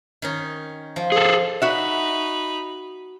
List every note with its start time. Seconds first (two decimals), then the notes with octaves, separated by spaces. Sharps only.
0.22 D#3 C#4 D#4
0.96 F3
1.12 G#4 A4
1.62 D#4 F#4 E5 B5